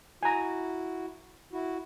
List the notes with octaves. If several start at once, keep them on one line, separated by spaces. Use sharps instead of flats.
E4 F#4 G#5 A#5
E4 F#4